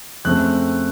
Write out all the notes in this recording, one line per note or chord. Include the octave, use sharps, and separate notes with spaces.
F2 C#3 A3 C4 F#6